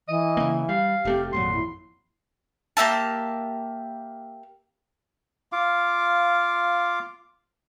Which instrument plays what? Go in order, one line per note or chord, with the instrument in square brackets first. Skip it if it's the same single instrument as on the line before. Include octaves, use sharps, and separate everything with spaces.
[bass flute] E3 [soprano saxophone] D#5
[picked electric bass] C#3 A#3
[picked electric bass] G3 [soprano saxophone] F5
[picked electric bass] F1 A3 C4 [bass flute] G4
[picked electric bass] G#1 F2 A#2 [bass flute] F#3 [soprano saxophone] C6
[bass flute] E4
[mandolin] A#3 G4 E5 A5
[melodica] F4 F5 D6